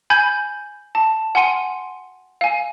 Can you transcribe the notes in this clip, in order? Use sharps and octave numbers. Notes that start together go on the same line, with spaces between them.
G#5 B5 G6 G#6
A5
F#5 G#5 C6 C#7 D#7
F5 G#5